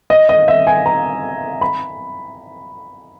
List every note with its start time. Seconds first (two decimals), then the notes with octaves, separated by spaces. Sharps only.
0.10 D#5
0.29 D#5
0.48 E5
0.67 G#5
0.86 A#5
1.61 B5